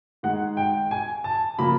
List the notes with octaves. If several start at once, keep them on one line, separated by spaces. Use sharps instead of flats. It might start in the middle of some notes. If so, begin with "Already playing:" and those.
D#3 G#3 F#5
G5
G#5
A5
C#3 F3 A#3 B5